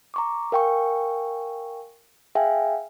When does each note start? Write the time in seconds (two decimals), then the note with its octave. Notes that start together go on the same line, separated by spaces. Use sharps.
0.14 A#5 C#6 D6
0.52 A#4 F5 G5 G#5 C#6
2.35 G#4 E5 F5 G5 G#5